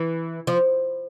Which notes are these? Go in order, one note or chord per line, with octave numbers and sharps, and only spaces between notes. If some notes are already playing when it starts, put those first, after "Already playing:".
Already playing: E3
F3